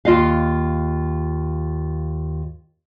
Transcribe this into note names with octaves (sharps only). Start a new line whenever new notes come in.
D#2 F4 D#5 F5